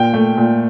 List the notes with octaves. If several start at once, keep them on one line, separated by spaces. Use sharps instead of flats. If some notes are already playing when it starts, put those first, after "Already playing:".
Already playing: A#2 G5
A3
A#2